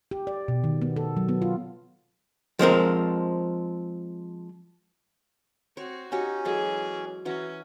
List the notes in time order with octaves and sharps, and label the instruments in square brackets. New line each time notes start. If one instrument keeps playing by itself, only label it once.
[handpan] G4
D5
B2
D#3
B3
A4
F#3
B3
F4
[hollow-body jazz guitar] F3 G#3 C4 A#4
[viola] C4 F#4 [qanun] C#5
[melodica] C#4 [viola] D#4 [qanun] F#4 G4 C#5
[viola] E3 G#4 [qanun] F#3 G#3 A4
[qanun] E3 F#4 A#5 [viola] C#4